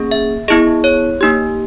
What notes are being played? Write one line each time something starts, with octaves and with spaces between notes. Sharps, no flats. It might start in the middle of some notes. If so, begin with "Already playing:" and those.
Already playing: A#3 C#4 G#4
E5
B3 E4 G#4 D#5
C#5
A#3 D#4 G4